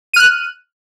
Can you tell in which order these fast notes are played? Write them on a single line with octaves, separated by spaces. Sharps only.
D#7 F6 F#6